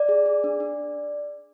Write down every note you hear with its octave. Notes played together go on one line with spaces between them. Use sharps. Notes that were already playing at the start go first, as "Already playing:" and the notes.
Already playing: D5
G#4
G#4
D4
D4